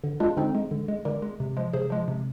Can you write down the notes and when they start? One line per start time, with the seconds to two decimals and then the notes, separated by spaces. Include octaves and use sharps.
0.04 D3
0.20 G#3 D4 F4
0.37 D3 C4 D#4
0.55 G#3
0.71 D3
0.88 G#3
1.05 D3 A#4 D5
1.22 G#3
1.40 C3
1.57 F3 G#3
1.73 C3 G#4 C5
1.90 F3 G#3
2.08 C3